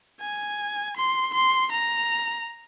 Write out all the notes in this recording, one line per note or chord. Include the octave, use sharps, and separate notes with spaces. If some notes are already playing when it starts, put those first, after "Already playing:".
G#5
C6
C6
A#5